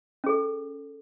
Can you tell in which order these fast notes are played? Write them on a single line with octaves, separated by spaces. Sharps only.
C#4 G#4 A4